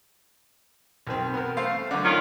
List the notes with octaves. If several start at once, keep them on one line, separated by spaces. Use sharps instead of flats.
B1 D#3 C4
B3 A#4
A3 C5 F5
F#2 D3
D#3 C#4 F4